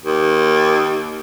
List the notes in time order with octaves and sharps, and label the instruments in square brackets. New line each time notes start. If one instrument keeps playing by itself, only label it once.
[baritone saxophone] D#2